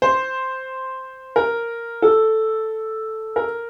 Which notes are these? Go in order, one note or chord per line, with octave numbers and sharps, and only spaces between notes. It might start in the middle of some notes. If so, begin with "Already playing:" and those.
C5
A#4
A4
A#4